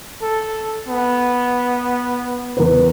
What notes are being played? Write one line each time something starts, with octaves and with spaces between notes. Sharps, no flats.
A4
B3
E2 A#4 B4